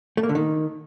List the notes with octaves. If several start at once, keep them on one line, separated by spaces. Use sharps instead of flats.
A3
A#3
D3
D#3